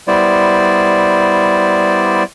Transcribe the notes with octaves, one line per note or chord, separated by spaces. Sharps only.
G3 B3 E4 C5 D5